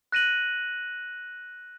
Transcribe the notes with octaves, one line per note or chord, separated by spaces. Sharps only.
F#6 A#6 D#7 F#7